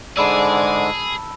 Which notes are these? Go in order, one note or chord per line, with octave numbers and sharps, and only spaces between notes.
G#2 D3 G#3 G#4 D5 A5 B5 E6